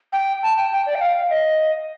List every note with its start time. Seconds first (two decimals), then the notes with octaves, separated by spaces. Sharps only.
0.12 G5
0.43 A5
0.57 G5
0.72 G5
0.86 D5
0.95 G5
1.01 F5
1.30 D#5